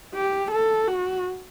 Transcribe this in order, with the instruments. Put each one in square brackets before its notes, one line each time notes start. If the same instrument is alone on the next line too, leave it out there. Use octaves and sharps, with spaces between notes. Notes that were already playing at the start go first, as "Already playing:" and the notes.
[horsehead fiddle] G4
A4
F#4